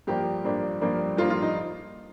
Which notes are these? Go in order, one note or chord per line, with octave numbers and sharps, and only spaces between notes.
G2 F3 A#3 D4 G4
G2 F3 A#3 D4
G2 F3 A#3 D4
G2 F3 A#3 D4 F4
F4
D#4